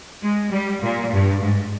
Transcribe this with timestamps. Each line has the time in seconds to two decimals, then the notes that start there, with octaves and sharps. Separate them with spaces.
0.23 G#3
0.52 G3
0.82 A#2
1.12 G2
1.42 G#2